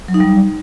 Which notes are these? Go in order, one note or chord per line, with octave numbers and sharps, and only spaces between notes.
F#3
D#4
G3